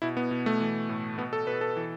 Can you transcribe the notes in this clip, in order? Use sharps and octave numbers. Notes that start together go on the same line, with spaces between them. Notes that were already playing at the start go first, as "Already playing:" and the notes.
B2 E4
B3
B2
A3
E3
A2
B2 B3
A4
B2 B4
A4
E3